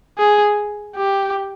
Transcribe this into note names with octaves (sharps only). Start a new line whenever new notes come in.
G#4
G4